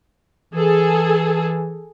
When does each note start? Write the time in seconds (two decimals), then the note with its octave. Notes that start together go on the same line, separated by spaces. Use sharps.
0.54 E3 G#4 A4